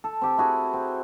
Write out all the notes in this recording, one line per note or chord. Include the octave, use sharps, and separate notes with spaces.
A4
C4 G4 A4
E4 F#4 G#4 A4
C4